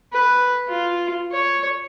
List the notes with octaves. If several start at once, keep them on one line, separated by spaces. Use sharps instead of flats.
B4
F4
C#5